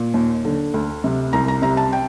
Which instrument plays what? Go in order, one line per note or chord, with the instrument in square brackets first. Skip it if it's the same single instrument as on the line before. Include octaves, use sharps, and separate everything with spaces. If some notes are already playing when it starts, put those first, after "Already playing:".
Already playing: [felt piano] A#2
D#2
D3
D2
C3
C2 A#5
A#5
C3 A#5
A5
G5